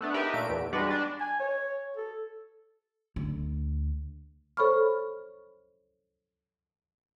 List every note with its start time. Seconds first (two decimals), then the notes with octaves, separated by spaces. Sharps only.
0.01 A3 B3 D4
0.14 D#4 G4 A#4 B4 E5
0.34 A#2 A3 D7
0.50 E2
0.73 G3 G#3 D4 F#4 B4
0.90 D4
1.21 G#5
1.40 C#5
1.97 A4
3.16 D2
4.57 A4 C5 C#5 B5 C#6 F6